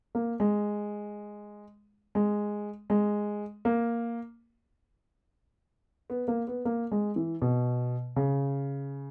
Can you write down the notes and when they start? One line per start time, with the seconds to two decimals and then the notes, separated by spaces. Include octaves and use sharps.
0.15 A#3
0.40 G#3
2.15 G#3
2.90 G#3
3.65 A#3
6.10 B3
6.28 A#3
6.48 B3
6.65 A#3
6.91 G#3
7.16 E3
7.42 B2
8.16 C#3